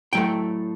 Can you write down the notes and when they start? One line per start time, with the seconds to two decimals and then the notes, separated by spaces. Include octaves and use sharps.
0.13 A2 F#3 A3 G5